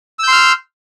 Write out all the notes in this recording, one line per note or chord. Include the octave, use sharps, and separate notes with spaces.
C6 E6 F6 G6